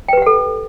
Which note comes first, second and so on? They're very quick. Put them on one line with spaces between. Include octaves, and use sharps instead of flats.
G5 B4 G4 F#5 A4